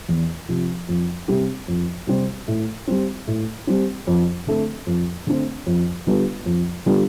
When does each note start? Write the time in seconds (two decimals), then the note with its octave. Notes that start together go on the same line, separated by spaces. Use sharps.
0.09 E2
0.49 C3 F3
0.88 F2
1.28 C3 G3 C4 G4
1.68 F2
2.07 C3 G3 C4 G4
2.48 A2
2.87 G3 C4
3.27 A2
3.67 G3 C4
4.07 F2
4.47 D3 A3 C4
4.87 F2
5.27 D3 A3 C4
5.66 F2
6.07 D3 G3 B3 F4
6.46 F2
6.86 D3 G3 B3 F4